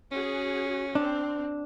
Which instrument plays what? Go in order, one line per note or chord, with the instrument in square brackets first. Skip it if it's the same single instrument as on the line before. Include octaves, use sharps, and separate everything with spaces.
[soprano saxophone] C#4 [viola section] F#4 G#4
[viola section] C4 [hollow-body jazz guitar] D4